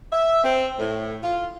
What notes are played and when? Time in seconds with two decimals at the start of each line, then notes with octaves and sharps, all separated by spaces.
0.12 E5
0.44 C4
0.79 A2
1.23 F4